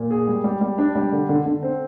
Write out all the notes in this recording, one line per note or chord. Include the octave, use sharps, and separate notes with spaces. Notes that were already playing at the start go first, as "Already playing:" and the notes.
Already playing: A#2
G#4
G3
G3
G3
D4
G3
D3
D3
D3
C4